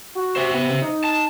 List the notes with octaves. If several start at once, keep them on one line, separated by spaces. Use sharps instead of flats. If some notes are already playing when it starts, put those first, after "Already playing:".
F#4
C5 E5
B3
C#3
D#4
A5